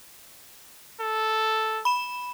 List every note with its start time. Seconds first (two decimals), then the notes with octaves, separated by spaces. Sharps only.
1.00 A4
1.85 B5 E7